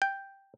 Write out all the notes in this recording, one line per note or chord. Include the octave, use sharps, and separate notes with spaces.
G5